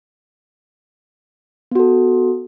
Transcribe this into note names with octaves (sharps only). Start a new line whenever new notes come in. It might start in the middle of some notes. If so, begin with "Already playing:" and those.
B3 F#4 A4